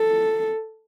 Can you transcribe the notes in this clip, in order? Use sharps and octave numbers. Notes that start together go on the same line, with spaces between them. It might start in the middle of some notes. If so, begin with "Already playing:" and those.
Already playing: A4